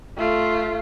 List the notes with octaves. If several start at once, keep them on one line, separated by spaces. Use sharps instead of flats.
A3 F4